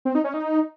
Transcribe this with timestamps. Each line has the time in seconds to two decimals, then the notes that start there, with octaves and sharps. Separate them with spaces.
0.05 C4
0.15 D#4
0.24 C#4
0.34 D#4